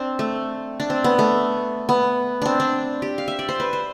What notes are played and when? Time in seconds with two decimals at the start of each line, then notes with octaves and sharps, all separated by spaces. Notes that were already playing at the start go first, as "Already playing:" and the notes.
Already playing: C4 D4
0.19 A3
0.80 D4
0.90 C4
1.04 B3
1.19 A3
1.89 B3
2.42 C4 D4
2.60 D4
3.02 G4
3.18 F5
3.28 E5
3.39 D5
3.49 C5
3.60 B4
3.73 C5